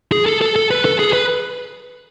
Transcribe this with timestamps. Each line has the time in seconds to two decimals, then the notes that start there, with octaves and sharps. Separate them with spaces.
0.12 G#4
0.26 A4
0.41 A4
0.56 A4
0.71 B4
0.85 A4
0.99 G#4
1.13 B4